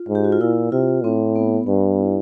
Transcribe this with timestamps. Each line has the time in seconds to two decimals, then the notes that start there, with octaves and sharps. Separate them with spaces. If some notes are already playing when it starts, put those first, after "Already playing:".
Already playing: F4
0.09 G#2
0.15 G4
0.24 F#4
0.32 F4
0.40 A#2 E4
0.72 C3 F4
1.04 A2 C4
1.36 B3
1.67 G2 B3
1.98 E4